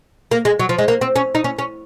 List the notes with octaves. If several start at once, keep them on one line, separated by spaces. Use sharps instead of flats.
A#3
G#3
F#3
F3
G#3
A#3
C4
C#4
D#4
C#4
C#4